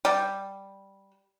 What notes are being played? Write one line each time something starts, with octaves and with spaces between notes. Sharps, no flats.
G3